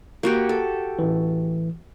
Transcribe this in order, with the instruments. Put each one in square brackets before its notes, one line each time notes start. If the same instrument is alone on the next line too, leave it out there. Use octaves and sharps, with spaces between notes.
[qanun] A#3 F#4 G4
A4
[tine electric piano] A1 E3